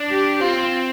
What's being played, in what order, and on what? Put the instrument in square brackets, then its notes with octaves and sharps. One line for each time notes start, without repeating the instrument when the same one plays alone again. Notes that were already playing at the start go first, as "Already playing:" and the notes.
Already playing: [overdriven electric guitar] D4
[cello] G4
[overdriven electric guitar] C4 [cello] F4